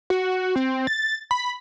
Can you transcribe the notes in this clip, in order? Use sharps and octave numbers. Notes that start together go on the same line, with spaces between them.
F#4
C4
A6
B5